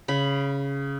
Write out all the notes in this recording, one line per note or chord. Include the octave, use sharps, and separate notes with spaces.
C#3 B5